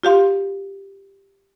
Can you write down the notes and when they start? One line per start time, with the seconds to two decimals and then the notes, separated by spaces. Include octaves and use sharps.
0.03 F4 G4 F5 C6